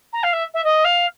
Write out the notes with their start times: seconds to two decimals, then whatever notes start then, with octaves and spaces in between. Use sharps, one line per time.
0.12 A#5
0.23 F5
0.32 E5
0.53 E5
0.64 D#5
0.84 F5